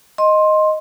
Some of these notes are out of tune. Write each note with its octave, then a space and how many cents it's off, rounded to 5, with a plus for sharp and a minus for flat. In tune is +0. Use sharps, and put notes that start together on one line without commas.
D#5 +0 C6 +15